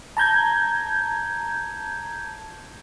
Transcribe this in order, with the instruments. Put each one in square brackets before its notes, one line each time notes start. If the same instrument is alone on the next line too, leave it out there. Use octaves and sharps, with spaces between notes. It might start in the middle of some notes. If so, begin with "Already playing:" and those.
[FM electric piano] A5 A#5 G6 G#6